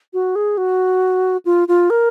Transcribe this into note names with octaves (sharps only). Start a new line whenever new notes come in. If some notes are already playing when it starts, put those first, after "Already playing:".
F#4
G#4
F#4
F4
F4
A#4